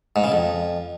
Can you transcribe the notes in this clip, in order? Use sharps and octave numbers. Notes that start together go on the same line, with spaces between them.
G#2
C#3
F2